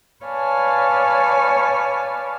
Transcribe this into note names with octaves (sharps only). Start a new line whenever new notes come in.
B4 C#5 D5 F5 G#5 A5